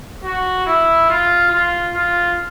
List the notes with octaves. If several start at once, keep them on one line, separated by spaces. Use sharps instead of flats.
F#4
E4
F4
F4
F4